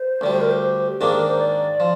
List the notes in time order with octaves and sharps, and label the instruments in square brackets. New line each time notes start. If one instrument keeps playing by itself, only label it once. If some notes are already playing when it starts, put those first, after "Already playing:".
Already playing: [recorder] C5
[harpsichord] D2 D3 G3 [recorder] D5
[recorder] C5
A#4
C5
G4
[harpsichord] G#2 D#3 A#3 D4 [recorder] G#4
[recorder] A#4
C5
D5
[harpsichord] F3